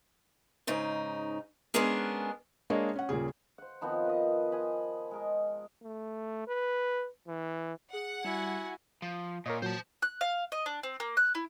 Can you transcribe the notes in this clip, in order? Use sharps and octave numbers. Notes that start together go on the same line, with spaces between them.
G#2 C#3 D#4
G#3 B3 C#4 D4 G#4 A#4
G#3 A#3 D4 G#4 C#5 D#5
C#4 F#5
D#1 A#2 C#3 G#4
C5 F#5
D#3 F3 B3 C4
B4 D#5
C5 D#5 G#5 B5
G#3 A#4 D#5
A3
B4
E3
G#4 F#5
G3 E4 F#4 G#5
F3
A#2 A#4 C#5 D#5
A#2 F#3 C5 A5
F#6
F5
D#5
D4
C4
A#3
F#6
E4